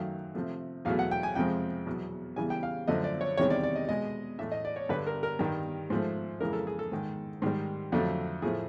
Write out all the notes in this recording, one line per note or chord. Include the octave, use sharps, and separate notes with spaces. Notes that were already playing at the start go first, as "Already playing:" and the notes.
Already playing: F#2 D#3 F#3 A3 F5
C3 F3 A3
E2 B2 F#3 A3 F5
F#5
G5
G#5
F2 C3 F3 G#3 G5
E2 B2 F#3
E2 C#3 E3 G3 G#5
G5
F5
F#2 D3 F3 A3 D#5
D5
C#5
E2 C3 D#3 G3 C#5
D5
D5
D#5
B2 G#3 D#5
A2 E3 A3 E5
D#5
D5
C#5
G2 D3 G3 B4
A#4
A#4
G2 D#3 G3
G#2 F3 A3
F2 C#3 E3 G#3 A#4
A4
G#4
A4
G#2 D#3 G#3
G#2 D#3 G3
F2 D3 F#3 A3
A2 F3 A3 G#4